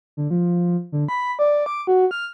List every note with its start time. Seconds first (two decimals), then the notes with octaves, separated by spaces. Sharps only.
0.17 D3
0.31 F3
0.92 D3
1.08 B5
1.39 D5
1.66 D6
1.87 F#4
2.11 F6